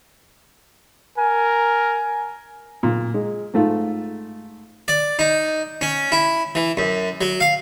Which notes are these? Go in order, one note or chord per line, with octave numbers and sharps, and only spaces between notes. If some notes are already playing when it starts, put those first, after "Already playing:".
A#4 G#5
A#2
G#3
G#2 A3 F4
D5
D#4
C#4
E4
E3
F#2
F#3
F5